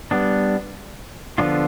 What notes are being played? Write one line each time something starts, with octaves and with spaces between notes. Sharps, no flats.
G3 B3 D4
D3 F3 B3 D4 F4